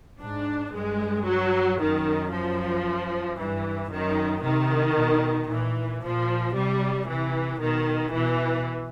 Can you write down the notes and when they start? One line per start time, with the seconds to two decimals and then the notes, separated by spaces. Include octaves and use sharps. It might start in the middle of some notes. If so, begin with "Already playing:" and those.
0.21 G#2 D4
0.73 G2 G#3
1.26 F#3
1.79 F#2 D#3
2.32 F3
3.38 G2 E3
3.90 F#2 D#3
4.43 C3 D#3
4.96 B2
5.49 A#2 E3
6.02 A#2 F3
6.54 C3 G3
7.07 C3 E3
7.60 B2 D#3
8.13 B2 E3